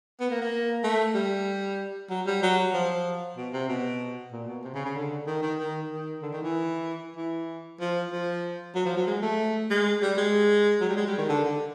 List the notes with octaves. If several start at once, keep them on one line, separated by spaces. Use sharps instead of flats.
B3
A#3
A#3
A3
G3
F#3
G3
F#3
F3
B2
C3
B2
A#2
B2
C3
C#3
C#3
D3
D#3
D#3
D#3
D#3
D3
D#3
E3
E3
F3
F3
F#3
F3
F#3
G#3
A3
G#3
G3
G#3
F#3
G3
G#3
G3
D#3
D3
D3